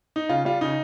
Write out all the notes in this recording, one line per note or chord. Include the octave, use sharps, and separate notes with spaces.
D#4
C#3 F4
G3 F4
C#3 D#4